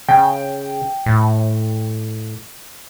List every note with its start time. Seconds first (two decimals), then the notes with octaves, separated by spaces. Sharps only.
0.09 C#3 G5
1.06 A2